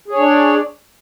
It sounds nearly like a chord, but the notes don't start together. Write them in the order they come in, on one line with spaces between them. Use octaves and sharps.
G#4 C#5 D4 D5